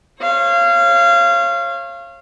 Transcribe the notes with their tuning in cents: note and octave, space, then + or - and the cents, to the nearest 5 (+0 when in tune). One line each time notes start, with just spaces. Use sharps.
C#5 -35 F5 -25